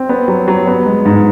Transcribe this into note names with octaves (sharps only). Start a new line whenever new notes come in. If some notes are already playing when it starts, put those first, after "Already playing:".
Already playing: C4
B3
F#3
F#3
B3
G#3
G#2